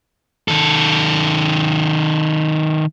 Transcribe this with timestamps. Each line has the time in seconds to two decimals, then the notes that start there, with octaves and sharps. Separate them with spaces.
0.48 D#3 A4